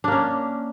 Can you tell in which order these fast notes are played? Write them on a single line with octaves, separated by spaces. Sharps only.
D4 A#3 C#4